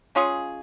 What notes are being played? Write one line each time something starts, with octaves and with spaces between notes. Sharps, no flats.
G#3 C#4 F4 G#4